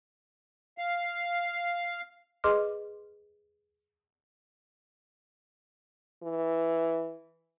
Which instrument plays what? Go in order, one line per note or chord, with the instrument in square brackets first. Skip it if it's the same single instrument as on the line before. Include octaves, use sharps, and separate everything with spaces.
[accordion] F5
[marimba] G#4 B4 D#5 C6 D6 F6
[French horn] E3